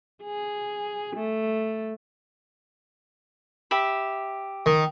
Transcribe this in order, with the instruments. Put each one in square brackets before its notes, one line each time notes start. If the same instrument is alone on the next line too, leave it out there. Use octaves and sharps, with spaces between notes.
[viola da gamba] G#4
A3
[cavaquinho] G4 E5 B5
[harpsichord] D#3